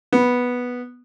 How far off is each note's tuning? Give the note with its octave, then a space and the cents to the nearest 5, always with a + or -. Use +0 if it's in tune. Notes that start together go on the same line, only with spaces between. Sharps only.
B3 -5